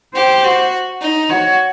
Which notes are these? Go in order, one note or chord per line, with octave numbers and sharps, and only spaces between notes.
G4 C5
F#4
D#4
F#4 C#5